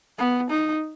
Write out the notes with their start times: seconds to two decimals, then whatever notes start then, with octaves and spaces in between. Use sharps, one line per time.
0.18 B3
0.50 D#4